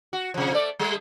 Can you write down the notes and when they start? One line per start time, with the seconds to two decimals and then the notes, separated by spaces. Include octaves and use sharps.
0.13 F#4
0.34 C3 F3
0.52 A3 D5
0.79 G3 A3